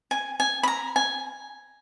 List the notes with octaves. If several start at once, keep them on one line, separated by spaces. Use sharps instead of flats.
G#5
G#5
B5
A#5
G#5